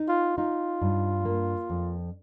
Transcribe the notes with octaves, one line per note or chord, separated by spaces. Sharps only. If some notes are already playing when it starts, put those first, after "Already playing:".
Already playing: D#4
F4
D#4 F4
G2
A#3
F2